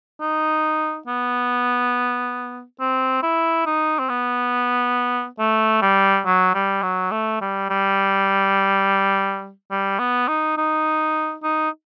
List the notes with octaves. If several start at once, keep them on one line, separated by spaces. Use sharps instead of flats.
D#4
B3
C4
E4
D#4
C4
B3
A3
G3
F#3
G3
F#3
A3
G3
G3
G3
B3
D#4
D#4
D#4